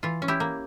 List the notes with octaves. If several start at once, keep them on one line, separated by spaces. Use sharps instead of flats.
E3 F4
C#4
E4 G4
A#3